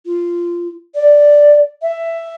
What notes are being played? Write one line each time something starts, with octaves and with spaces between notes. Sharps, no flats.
F4
D5
E5